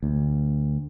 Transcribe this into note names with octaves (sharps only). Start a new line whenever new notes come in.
D2